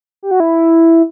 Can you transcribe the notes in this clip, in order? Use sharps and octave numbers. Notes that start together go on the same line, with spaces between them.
G4
F#4
E4